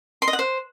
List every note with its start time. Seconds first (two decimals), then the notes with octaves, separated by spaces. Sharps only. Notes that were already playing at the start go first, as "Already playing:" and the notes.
0.22 C6
0.28 D#5
0.33 F#5
0.39 C5